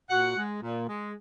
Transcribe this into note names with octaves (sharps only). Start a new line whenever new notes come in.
A#2 F#4 F#5
G#3
A#2
G#3